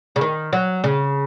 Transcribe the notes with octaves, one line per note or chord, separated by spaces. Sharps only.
C#3
D#3
F#3
C#3